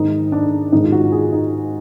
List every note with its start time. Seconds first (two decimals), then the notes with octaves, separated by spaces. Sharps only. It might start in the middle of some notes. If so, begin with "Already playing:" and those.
Already playing: G#2 D#3 D#4
0.32 D4
0.72 G#2 D#3 D#4
0.85 F4
0.92 F#4
1.12 G#4
1.32 D#4